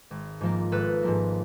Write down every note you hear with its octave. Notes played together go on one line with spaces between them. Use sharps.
G#1
G#2 F3 A#3
G#1 A4 B4
G#2 F3 A#3